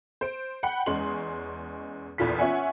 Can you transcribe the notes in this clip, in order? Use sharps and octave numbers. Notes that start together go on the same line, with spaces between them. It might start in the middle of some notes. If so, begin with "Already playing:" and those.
C5 D7
F#5 G5 B5 C#7
E2 G#3 C#4 G#4 C6 F#7
A#1 E2 E3 F4 A4 B6
C#4 F4 C#5 E5 F#5 G#5